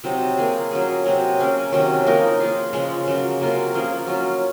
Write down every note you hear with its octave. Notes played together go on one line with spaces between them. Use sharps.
C3 F#3 C4 D#4
A#3 F4 G#4
F#3 C#4 G#4
C3 F#3 C4
A#3 C#4 G#4
C3 D#3 F#3 C#4
F3 A#3 D#4 A#4
A#3 F4 G#4
C#3 F3 G#3 C#4
C#3 F#3 A#3
C3 F#3 A#3 F4
F3 A#3 C#4 G#4
F#3 C#4 F4